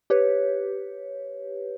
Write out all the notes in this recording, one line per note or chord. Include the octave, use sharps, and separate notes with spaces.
G4 B4 C#5